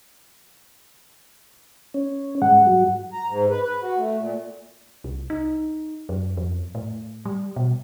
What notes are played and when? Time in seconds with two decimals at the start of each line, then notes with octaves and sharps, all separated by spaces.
1.94 C#4
2.42 G2 G#3 F#5
2.67 F#3 F#4
3.13 A#5
3.28 G#2
3.50 B4
3.63 B4
3.82 F#4
3.97 A3
4.18 A#2
5.04 C2
5.30 D#4
6.09 F#2
6.37 F2
6.75 A2
7.25 G3
7.56 B2